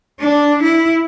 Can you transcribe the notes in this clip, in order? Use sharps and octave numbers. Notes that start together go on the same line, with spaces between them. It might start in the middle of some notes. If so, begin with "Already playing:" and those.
D4
E4